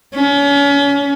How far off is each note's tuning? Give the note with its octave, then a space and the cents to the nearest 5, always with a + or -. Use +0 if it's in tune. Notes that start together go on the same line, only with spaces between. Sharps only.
C#4 +35